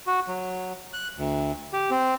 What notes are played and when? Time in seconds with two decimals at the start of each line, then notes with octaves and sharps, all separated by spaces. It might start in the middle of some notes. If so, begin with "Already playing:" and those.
0.07 F#4
0.28 F#3
0.93 F#6
1.17 D2
1.73 G4
1.91 C4